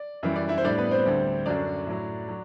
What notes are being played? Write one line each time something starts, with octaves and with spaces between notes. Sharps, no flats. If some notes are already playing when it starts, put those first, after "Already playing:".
Already playing: D5
F#2 E3 G3 E5
D5
E4 E5
C5
A2 G3 D4 D5
B3 B4
C4 C5
D2 D3 G3
F#2 D3 F#3 D4 D5
A2 F#3
F#3